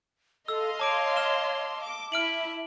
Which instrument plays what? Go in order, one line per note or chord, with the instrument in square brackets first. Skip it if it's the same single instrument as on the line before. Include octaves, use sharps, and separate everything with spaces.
[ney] A4 [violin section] D#5 F5 C6 [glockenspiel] E6
[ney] C#5 [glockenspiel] A5 D6 D7
[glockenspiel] F6 E7 G7
[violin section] D6
[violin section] E4 [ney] E5 [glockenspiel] F6 D7 F#7